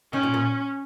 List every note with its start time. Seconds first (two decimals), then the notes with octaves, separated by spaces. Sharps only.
0.13 D#3 C#4
0.23 A#2
0.34 A#2